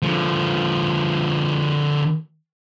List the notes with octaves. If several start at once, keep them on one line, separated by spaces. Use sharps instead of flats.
D3 F3